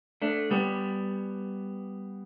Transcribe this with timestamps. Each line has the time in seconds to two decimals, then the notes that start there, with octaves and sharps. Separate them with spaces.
0.22 A3 D4
0.51 G3 B3